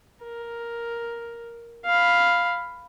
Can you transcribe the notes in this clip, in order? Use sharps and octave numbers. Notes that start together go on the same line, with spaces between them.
A#4
F5 B5